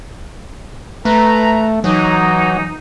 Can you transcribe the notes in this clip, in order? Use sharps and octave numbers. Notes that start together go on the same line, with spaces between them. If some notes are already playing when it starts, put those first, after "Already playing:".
A3 B4 A#5
E3 F#3 D#4